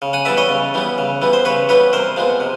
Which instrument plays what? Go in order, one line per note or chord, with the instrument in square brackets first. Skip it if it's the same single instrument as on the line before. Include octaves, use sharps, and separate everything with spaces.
[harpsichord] C#3
F#5 G#5
E3 G3 B3 D5 E5
C#5 D#5
C#3
E3 G3 B3
C#3
E3 G3 B3
C5
C#3 B4 C#5
E3 G3 B3 B4 C#5
C3 A#4 C5
F3 G#3 B3
C3